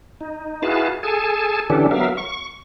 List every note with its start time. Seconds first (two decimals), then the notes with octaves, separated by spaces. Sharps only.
0.21 D#4
0.63 E4 F#4 G#4 B4 F5 A5
1.03 G#4 A4 G#5 A5
1.70 D3 E3 C#4 D4 G4 A4
1.91 F#3 B3 A#4 E5 F5
2.17 C#6